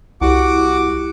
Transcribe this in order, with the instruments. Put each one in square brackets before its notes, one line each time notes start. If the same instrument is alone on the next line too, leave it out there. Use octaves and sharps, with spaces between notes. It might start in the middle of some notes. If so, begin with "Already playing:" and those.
[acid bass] C2 [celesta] E4 G4 [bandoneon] F#4 F#5 [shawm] D6